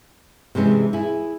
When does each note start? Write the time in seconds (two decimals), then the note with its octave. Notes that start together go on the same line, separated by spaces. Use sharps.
0.55 C3 E3 G#3 C#4
0.93 E4 G#4